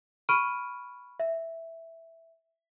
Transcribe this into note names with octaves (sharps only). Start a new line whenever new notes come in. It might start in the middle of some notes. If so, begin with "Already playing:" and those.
B5 C#6 F6 D7 D#7
E5